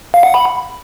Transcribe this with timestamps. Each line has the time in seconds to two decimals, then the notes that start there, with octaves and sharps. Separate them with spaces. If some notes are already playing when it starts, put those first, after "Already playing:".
0.14 F5
0.23 F#5
0.34 B5